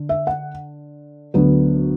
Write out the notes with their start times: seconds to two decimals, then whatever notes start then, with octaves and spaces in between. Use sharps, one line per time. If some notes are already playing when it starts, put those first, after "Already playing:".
Already playing: D3
0.09 E5
0.27 F#5
1.34 D2 D3 F#3 B3